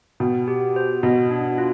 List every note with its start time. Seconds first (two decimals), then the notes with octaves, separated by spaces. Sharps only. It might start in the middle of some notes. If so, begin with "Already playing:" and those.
0.20 B2 G5
0.48 G4
0.76 C5
1.03 B2 D#5
1.31 D4
1.58 F4